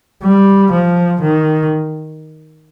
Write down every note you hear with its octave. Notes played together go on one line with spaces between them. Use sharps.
G3
F3
D#3